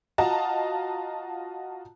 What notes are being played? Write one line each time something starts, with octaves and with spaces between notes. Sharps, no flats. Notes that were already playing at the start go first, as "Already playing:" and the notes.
F4 F#4 D#5 A5 A#5